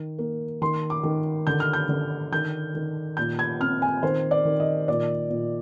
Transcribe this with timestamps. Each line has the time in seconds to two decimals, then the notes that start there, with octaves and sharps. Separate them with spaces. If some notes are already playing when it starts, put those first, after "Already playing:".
Already playing: D#3
0.19 A#3
0.62 D#3 C6
0.90 D6
1.03 D#3
1.47 D3 G6
1.60 F6
1.73 G6
1.89 D3
2.32 D#3 G6
2.75 D#3
3.17 A#2 G6
3.39 G#6
3.60 C4 F6
3.82 G#5
4.03 D#3 C5
4.31 D5
4.45 D#3
4.60 D#5
4.88 A#2 D5
5.30 A#2